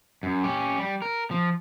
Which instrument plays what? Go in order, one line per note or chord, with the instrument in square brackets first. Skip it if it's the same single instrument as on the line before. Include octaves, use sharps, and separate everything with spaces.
[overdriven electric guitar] F#2
C#4 G4
G3
A#4
F3